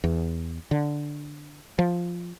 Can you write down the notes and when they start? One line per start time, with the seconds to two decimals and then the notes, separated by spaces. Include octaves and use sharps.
0.04 E2
0.71 D3
1.79 F3